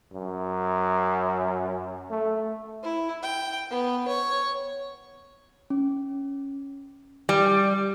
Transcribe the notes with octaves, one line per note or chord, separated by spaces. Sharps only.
F#2
A3
E4
G5
B3
C#5
C#4
G3